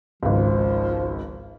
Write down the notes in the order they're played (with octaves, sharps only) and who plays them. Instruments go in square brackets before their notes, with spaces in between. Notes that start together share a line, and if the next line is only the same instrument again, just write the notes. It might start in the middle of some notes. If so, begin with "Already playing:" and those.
[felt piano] G#1 C#2 [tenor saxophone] F3